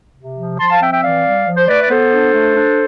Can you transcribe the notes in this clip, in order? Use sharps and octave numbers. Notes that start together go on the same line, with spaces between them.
C3
F3
F3 A5 C6
F5 A5
C4 E5 G5
E5 G5
E3 D5 F5
G3
F3
C5
A3 B4 D5
D5
B3 A4 C5
D4
A3
D4